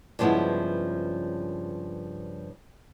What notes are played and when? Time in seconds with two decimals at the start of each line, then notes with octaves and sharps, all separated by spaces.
0.19 G2 C#3 F3 G#3 B3 E4